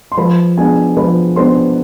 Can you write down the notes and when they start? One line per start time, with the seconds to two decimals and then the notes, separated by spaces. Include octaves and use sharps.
0.12 C6
0.17 F3 B4 B5
0.58 B3 D4 G#4 G#5
0.97 F3 B4 B5
1.36 B3 D4 C5 C6